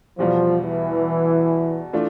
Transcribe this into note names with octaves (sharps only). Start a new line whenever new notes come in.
E2 B2 F3 G3
E3
E3 A3 D4 F4